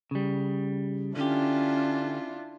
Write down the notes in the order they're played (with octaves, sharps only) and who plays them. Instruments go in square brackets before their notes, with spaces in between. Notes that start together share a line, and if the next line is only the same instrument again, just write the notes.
[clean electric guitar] C#3 G3
[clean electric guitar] D3 G4 [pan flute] C#4 [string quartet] D4 E4 F4